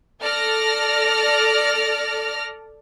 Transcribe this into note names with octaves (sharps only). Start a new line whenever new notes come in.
A4 D5 F6 A#6